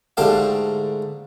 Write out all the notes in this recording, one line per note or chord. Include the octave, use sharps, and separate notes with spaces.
G#2 D3 A3 G4 D5 F5